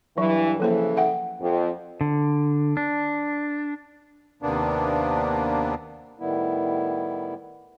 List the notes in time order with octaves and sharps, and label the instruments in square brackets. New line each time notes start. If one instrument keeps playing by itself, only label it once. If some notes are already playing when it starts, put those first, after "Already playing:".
[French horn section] G2 E3 [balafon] F#3
[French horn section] C#3 E3 A4 [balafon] F3 A#3 C5
[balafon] E5 F#5 G5
[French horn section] F2
[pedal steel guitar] D3
D4
[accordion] D#2 C3 A#3 B3 D4
[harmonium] A2 D#3 G3 B3 E4